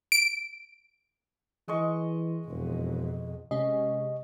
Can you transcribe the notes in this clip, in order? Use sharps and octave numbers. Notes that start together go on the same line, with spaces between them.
D7
E3 G#3 D#5 C#6
E1 F2 B2
C3 G#3 C#4 D#5